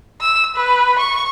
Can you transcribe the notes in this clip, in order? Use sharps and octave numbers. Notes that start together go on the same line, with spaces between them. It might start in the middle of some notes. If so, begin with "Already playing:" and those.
E6
B4
C#6